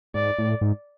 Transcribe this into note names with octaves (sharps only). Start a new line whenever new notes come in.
G#2 D5
A2
G#2